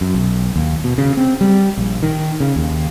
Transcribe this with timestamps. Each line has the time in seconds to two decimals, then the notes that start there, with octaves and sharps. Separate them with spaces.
0.01 F#2
0.15 B1
0.56 D#2
0.84 B2
0.98 C#3
1.17 C4
1.41 G3
1.77 A#1
2.03 D#3
2.40 C#3
2.56 D#2